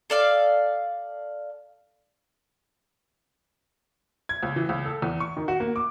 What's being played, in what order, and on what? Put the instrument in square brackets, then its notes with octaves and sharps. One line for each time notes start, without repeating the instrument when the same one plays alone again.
[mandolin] A4 D5 F5
[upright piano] G#6
C#2
E3
C#2
A4
E2
C#6
D#3
F#4
A#3
D6